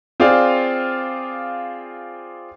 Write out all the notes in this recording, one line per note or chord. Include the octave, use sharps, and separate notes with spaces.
C4 F4 G#4 D5 F5